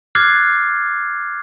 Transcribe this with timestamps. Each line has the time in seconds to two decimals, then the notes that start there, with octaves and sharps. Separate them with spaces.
0.15 D6 F6 F#6 G#6 A6 C7